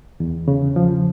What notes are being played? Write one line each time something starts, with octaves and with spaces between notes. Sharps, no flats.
E2
C#3
F3